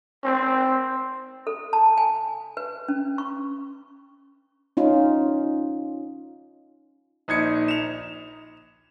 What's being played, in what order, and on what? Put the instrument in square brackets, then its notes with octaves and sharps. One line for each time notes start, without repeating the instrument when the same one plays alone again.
[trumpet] C4
[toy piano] A4
A5
G#5
B4
C#4
C#6
[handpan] C#4 D#4 F4
[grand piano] A#1 D#4 G#6 C#7
E7 F7